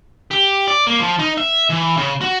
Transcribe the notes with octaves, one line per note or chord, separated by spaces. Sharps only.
G4
D5
A#3
F3
D#4
E5
E3
C#3
F#4